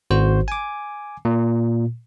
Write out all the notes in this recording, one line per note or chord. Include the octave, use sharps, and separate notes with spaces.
G#1 F#4 C5
G#5 D6
A#2